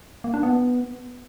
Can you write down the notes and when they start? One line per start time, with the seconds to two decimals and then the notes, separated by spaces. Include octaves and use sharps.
0.24 A#3
0.34 D4
0.43 B3